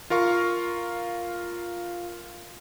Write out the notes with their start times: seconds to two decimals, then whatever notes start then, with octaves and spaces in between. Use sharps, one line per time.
0.10 F4 A#4 F5 C#6